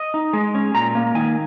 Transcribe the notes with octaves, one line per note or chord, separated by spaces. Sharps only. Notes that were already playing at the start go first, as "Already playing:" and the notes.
Already playing: D#5
D#4
G#3
C#4
A#2 A#5
A#3
D#3 G#5